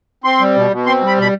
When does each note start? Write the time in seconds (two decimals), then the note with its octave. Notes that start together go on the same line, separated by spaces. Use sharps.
0.24 C4 C6
0.40 G3
0.56 B2
0.71 B2
0.86 C4 C6
1.02 G3 B5
1.18 B2 B5